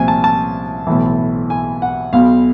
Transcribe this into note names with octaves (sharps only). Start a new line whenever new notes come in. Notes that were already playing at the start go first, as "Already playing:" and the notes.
Already playing: C2 A#2 F3 G#5
A5
A5
B1 A2 E3
G#5
F#5
B1 B2 F5